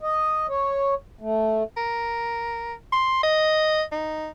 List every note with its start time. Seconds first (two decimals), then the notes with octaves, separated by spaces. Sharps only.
0.01 D#5
0.49 C#5
1.21 A3
1.77 A#4
2.92 C6
3.23 D#5
3.92 D#4